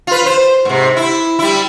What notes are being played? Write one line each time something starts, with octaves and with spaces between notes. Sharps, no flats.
F4 B4
C5
G#2 C3
E4
G3 E4